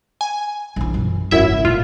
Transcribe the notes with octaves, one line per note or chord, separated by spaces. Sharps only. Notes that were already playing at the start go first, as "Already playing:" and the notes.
G#5
A#1 E3
F#2
G#1 F#2 C#3 E4 E5
A#2 F4